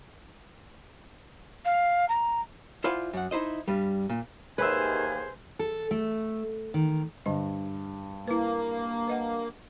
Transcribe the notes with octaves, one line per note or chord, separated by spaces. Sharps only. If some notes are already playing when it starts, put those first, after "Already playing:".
F5
A#5
E4 F4 C5 D5 F#5 G#5
F#2 F#5
D#4 E4 C5 D#5
G2 G3
A#2
D#2 G#4 B4 C5 E5 G#5
A4
A3
D#3
G2 D3 D#5
A#3 E4 B4
B4 D#5 F#5